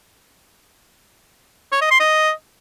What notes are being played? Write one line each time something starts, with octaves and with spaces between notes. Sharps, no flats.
C#5
D#5
C6
D#5